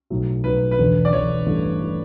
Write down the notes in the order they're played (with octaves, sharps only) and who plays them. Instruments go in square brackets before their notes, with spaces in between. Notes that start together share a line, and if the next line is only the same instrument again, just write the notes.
[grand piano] B1 A2 F#3
[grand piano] B1 A2 F#3 [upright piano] B4
[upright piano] B4
[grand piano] E1 E2 D3
[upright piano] D5
[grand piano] E1 E2 D3 [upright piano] C#5
[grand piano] A1 G2 E3 A3 E4
E3 A3 E4